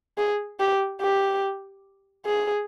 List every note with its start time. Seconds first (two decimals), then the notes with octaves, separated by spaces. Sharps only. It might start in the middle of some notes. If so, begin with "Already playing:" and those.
0.18 G#4
0.60 G4
1.01 G4
2.26 G#4